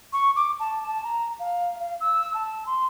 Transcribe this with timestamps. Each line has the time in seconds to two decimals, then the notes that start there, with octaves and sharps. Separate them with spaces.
0.13 C#6
0.36 D6
0.60 A5
0.87 A5
1.04 A#5
1.39 F5
1.80 F5
2.01 E6
2.34 A5
2.66 C6